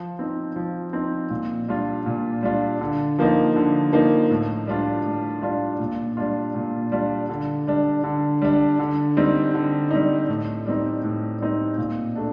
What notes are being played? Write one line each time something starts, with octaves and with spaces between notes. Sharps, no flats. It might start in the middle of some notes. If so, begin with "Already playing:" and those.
Already playing: F3
C4 D#4
F3
C4 D#4
A#2
G3 D4 F4
A#2
G3 D4 F4
D3
F3 A#3 D#4
D3
F3 A#3 D#4
A2
G3 D4 F4
A2
G3 D4 F4
A#2
G3 D4 F4
A#2
G3 D4 F4
D3
G3 D4
D3
G3 D4
D3
G3 C4 D#4
D3
G3 C4 D#4
A2
G3 C4 D#4
A2
G3 C4 D#4
A#2
A3 D4